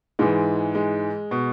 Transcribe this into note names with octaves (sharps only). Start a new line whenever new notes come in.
G#2 E3 G#3
G#3
B2